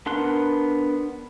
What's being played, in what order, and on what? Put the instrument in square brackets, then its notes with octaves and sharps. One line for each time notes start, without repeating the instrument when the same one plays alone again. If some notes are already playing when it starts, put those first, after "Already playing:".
[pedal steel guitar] B3 D4 A#4 C6 F#6